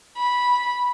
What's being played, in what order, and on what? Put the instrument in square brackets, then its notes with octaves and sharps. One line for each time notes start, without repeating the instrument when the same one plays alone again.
[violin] B5